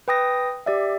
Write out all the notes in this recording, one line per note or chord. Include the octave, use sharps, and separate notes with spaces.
B4 G5 D#6 A#6
G4 D5 E5